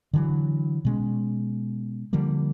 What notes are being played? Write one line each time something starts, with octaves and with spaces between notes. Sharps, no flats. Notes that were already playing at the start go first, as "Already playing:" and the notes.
D3 E3 F#3
B2 G#3 C#4
D3 F3 G3 A#3